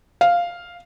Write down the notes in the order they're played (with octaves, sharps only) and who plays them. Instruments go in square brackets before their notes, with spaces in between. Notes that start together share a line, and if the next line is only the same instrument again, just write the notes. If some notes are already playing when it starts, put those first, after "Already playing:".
[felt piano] F5